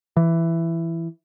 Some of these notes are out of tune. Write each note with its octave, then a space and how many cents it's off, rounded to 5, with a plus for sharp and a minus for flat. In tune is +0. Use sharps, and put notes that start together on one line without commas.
E3 +10